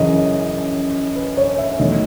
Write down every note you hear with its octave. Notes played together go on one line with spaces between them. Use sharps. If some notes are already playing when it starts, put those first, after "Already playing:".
Already playing: F#2 C#3 E3 D#5
B4
C#5
E5
E2 D#3 F#3 A3 D#5